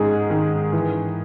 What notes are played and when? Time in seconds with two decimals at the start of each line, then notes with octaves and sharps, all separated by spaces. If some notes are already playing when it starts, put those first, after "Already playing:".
Already playing: G#2 D#3 G#3 D#4 G#4
0.30 D#3
0.73 E3